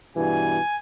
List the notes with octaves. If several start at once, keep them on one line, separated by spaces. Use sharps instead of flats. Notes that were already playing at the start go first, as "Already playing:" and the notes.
G2 B2 E3 G#5